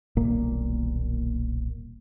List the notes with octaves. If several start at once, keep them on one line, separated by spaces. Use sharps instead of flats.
D#1 B1 A#2 A#3